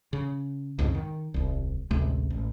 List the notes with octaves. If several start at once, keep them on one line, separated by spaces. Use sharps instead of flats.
C#3
C2 F2 G#2 C#3
D#3
D#1 C2
A1 D2 C3 G#3
A1